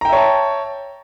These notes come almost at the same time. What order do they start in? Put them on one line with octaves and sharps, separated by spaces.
A#5 G5 E5 C#5 A5